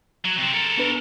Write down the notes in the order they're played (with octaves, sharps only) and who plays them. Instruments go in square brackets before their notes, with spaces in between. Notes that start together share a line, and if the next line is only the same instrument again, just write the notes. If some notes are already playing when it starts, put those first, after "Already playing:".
[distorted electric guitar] F#3
C3 C4
A4 A#4
[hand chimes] B3 D4 B4